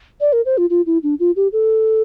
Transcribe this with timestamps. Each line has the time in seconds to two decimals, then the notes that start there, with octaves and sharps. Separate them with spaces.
0.21 D5
0.33 A#4
0.46 C5
0.58 F4
0.70 F4
0.86 E4
1.03 D4
1.20 F4
1.36 G4
1.53 A4